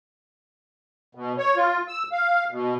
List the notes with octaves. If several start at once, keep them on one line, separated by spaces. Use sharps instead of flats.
B2
C#5
F4
E6
F5
B2